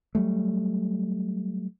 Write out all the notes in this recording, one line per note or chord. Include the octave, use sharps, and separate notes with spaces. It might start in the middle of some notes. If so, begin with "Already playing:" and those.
F#3 G3 A3